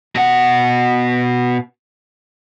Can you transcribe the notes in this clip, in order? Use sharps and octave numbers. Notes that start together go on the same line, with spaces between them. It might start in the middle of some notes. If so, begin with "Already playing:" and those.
B2 F#5